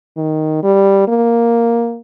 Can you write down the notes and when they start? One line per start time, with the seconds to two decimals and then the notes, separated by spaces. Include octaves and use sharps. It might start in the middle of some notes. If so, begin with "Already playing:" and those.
0.17 D#3
0.63 G3
1.08 A#3